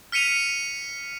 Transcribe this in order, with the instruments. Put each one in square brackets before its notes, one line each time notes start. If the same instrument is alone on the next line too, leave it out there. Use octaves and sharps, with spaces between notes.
[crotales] F6 B6 C#7 D#7 F7